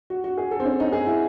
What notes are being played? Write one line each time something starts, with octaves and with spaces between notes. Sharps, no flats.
F#4
F#4
G#4
A4
C4
C#4
D#4
G#4
E4